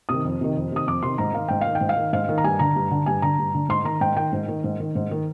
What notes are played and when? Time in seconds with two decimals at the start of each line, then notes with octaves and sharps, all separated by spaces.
0.09 C3 D#3 D#6
0.25 F2
0.41 C3 D#3
0.56 F2
0.72 C3 D#3 D#6
0.87 F2 D6
1.03 C3 D#3 C6
1.18 G#2 A#5
1.34 D#3 F5
1.48 G#2 G5
1.61 F5
1.66 D#3
1.75 G5
1.81 G#2
1.89 F5
1.97 D#3
2.13 G#2 F5
2.29 D#3
2.38 A#5
2.44 G2 G#5
2.59 D3 A#5
2.76 G2
2.91 D3
3.06 G2 G#5
3.22 D3 A#5
3.39 G2
3.55 D3
3.69 G#2 C6
3.85 D#3 A#5
4.01 G#2 G5
4.16 D#3 G5
4.33 G#2
4.48 D#3
4.64 G#2
4.80 D#3
4.95 G#2
5.11 D#3